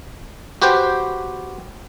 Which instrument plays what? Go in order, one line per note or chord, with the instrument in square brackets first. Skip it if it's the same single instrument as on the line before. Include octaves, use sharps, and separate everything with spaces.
[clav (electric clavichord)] F#4 G4 B4 C5 G5